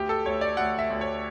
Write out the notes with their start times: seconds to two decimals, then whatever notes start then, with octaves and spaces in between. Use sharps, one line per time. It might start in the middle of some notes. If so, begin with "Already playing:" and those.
Already playing: D2 G4
0.09 A4
0.26 D2 C#5
0.41 D5
0.57 D2 F#5
0.79 E5
0.90 D2
1.01 C#5